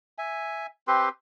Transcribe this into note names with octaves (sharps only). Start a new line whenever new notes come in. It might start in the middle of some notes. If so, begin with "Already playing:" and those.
E5 G#5
C4 G4 B4 C6